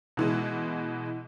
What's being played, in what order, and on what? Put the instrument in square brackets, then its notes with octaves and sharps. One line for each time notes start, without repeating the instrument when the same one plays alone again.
[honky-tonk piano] B2 E3 G#3